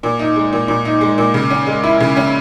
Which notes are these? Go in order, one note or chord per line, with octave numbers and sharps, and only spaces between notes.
A#2
D#4
G#3
A#2
A#2
D#4
G#3
A#2
C#3
C#4
G#3
E4
C#3
C#4